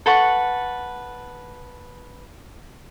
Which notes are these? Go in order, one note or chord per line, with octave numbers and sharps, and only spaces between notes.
A4 B4 F#5 C#6